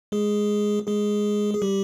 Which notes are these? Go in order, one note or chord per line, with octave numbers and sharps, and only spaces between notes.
G#3 G#4
G#3 G#4
G#4
G3 G4